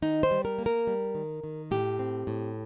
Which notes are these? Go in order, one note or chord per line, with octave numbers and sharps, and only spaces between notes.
D#3 D#4
C5
G3
A#4
A#3
A#4
G3
D#3
D#3
A2 G4
C4
A2